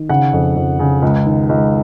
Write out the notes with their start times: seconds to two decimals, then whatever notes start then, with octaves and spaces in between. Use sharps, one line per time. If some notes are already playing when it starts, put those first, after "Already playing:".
Already playing: D#3
0.09 C#3 F#5
0.33 F2
0.56 F2
0.79 C#3
1.02 C#2
1.25 D#3
1.49 C#2